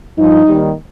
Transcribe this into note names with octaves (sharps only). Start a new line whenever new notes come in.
G2 F3 D#4
D#2 D#3 G3